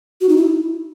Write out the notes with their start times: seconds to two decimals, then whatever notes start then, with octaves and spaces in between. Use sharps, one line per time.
0.21 F#4
0.29 D#4
0.37 E4